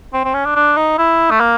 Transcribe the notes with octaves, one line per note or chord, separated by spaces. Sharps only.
C4
C4
C#4
D4
D4
D#4
E4
A3
A#3